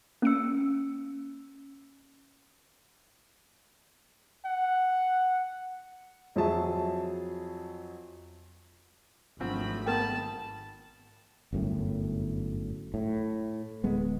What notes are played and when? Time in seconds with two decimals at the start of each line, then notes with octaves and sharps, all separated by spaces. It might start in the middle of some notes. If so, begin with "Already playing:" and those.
0.22 A#3 C#4 E6 C#7
4.45 F#5
6.36 F2 F#3 G#4 E5 A5
9.40 G#1 F3 F#3 A3 C4 B5
9.86 B3 G#4 A#4 G5 A5
11.53 G1 F#2 A2
12.94 A2
13.84 D1 G#3 B3